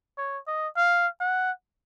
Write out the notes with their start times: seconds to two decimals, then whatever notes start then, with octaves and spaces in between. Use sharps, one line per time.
0.18 C#5
0.47 D#5
0.76 F5
1.20 F#5